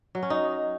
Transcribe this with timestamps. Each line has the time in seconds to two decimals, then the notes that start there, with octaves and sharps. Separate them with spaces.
0.15 F#3
0.23 C#4
0.30 D#4